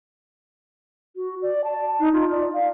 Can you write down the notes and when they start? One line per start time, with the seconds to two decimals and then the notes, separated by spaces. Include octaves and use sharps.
1.16 F#4
1.42 D5
1.64 A5
2.00 D#4
2.13 F4
2.31 D5
2.53 F5